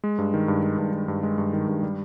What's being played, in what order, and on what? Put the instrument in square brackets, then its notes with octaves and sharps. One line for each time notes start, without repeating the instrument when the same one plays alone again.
[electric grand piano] G#3
G2
D#3
G2
G#3
G2
D#3
G2
G#3
G2
D#3
G2
G3